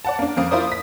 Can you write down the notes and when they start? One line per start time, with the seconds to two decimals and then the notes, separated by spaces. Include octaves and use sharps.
0.05 D5 F#5 A5
0.19 A#3 D4
0.37 F2 A#3 D#6
0.51 E4 F4 A#4 C5 D5 D#6
0.67 D#6 B6